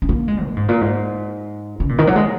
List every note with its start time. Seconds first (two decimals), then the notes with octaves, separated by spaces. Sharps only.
0.02 C#4
0.09 A#3
0.28 G#3
0.45 A#2
0.57 G#2
0.69 A#2
0.81 G#2
1.80 C#3
1.89 A#2
1.98 D#3
2.07 F#3
2.16 G#3